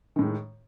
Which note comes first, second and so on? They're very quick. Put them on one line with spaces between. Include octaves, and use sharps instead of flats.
D#3 A2 G#3